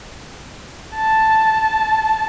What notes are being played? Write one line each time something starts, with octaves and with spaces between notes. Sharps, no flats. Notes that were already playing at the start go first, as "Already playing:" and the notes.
A5